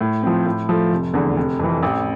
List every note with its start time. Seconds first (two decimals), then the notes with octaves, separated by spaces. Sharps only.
0.01 A2
0.23 F3 C4
0.46 A2
0.69 F3 A3
0.92 F1
1.14 E2 D3
1.36 F1
1.59 F2 E3
1.83 A1